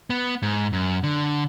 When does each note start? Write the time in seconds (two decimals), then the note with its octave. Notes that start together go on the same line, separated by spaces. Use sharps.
0.10 B3
0.42 G#2
0.73 F#2
1.03 D3